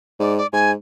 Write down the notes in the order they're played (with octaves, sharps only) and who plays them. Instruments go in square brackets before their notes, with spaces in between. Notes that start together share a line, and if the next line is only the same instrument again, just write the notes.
[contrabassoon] G#2 [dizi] D5
[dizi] D5
[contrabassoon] G#2 [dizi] G#5